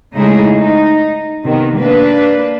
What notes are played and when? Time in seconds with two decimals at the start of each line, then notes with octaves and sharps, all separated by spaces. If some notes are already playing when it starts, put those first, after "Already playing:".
0.16 C#3 G#3 A3 D#4 E4 G#4
0.56 D#4
1.44 C3 D#3 B3
1.76 A#3 D4 B4